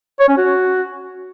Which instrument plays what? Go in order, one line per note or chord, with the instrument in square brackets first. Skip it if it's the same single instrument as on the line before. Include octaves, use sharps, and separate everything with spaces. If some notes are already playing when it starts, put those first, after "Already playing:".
[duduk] C#5
C#4
F#4